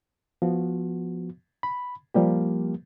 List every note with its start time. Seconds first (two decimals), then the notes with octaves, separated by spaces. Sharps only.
0.42 F3 B3 F#4
1.63 B5
2.14 F3 G3 A#3 G4